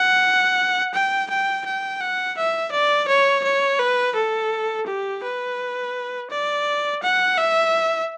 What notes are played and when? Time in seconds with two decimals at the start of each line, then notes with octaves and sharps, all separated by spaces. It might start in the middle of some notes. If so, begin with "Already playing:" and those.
Already playing: F#5
0.94 G5
1.30 G5
1.66 G5
2.00 F#5
2.37 E5
2.72 D5
3.08 C#5
3.44 C#5
3.79 B4
4.15 A4
4.87 G4
5.23 B4
6.30 D5
7.03 F#5
7.38 E5